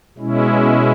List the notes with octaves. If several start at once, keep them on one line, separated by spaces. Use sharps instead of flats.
B2 G#3 C#4 E4